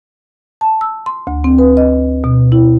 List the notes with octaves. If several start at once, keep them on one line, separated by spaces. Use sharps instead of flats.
A5
E6
C6
D2
C4
B4
D#5
B2
E4